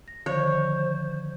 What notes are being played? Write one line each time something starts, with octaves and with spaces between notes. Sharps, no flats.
A#6
D3 D#3 F3 C5 C#5